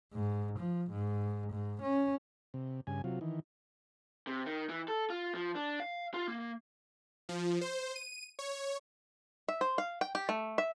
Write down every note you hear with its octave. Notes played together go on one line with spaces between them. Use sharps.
G#2
F3
G#2
G#2
C#4
C3
G2 C#3 G#5
C3 F#3 F4
D#3 E3
C3
D#3
E3
A4
F4
F3
D4
F5
F4
A#3
F3
C5
D#7
C#5
E5
C5
F5
G5
G4
A3
E5